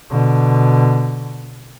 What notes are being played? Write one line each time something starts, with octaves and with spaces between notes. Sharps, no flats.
B2 D3